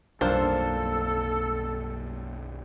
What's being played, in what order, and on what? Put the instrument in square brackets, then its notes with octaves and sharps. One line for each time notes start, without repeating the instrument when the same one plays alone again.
[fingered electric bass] B1 F#2 G3 [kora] A#3 D4 F4 [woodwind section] A4 [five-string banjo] C5